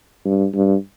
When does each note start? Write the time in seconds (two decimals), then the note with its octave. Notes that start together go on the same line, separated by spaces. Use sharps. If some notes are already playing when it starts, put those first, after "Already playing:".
0.25 G2
0.54 G2